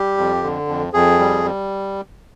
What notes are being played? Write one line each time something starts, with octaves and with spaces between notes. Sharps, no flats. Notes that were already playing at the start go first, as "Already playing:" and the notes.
Already playing: G3 G4
F2
D3
F2
F2 G#4
G3
G3